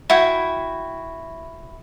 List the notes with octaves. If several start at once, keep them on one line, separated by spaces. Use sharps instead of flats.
E4 F#4 G5